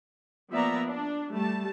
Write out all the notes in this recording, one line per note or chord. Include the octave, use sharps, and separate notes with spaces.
F3 A#3 B3 D5 E5 A#5
D4
G3 A3 A5